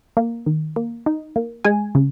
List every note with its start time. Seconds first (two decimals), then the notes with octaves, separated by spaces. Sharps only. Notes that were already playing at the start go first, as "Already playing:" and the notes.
0.17 A#3
0.46 D#3
0.76 A#3
1.06 D#4
1.36 A#3
1.65 G#3 G#5
1.95 C#3